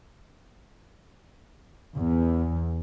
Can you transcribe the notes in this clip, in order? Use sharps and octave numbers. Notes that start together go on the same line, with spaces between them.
E2